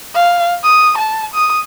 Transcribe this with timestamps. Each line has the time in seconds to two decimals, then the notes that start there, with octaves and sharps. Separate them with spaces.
0.15 F5
0.64 D#6
0.98 A5
1.34 D#6